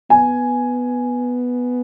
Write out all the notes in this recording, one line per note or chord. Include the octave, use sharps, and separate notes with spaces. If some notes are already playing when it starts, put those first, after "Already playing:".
B3 G#5